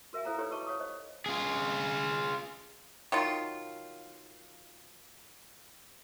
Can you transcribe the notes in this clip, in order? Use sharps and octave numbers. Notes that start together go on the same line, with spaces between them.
F#4 A#4 E5 F5 G#5
E4 A4 C5 E5 F5 A#5
D#4 G4 B4 C#5
F#4 B4 D#5 A5 C#6 D6
C#5 F5 C#6 D#6
C5 D#5
F4 G#4
D#3 F#3 F4